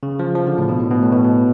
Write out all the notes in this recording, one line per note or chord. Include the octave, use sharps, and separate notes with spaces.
C#3
F3
F3
D3
A2
B2
A2
B2
A2
B2
B2